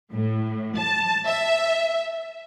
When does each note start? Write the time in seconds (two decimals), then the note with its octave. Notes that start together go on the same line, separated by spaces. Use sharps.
0.11 A2
0.77 A5
1.26 E5